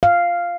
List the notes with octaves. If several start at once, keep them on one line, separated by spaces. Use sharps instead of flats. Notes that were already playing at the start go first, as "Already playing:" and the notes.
F5